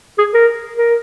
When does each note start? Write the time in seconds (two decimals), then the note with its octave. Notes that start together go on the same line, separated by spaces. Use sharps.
0.18 G#4
0.34 A#4
0.77 A#4